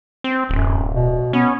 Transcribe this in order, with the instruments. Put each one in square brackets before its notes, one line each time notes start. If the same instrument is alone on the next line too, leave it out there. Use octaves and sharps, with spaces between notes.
[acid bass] C4
[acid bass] D1 [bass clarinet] F#2
[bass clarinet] B2
[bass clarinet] B3 [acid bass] C#4